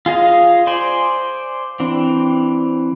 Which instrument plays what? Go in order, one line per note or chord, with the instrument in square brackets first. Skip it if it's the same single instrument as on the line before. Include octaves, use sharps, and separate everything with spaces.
[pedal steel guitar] F4 G#4 D#5 F5
C5 D5 G#5
E3 C4 D4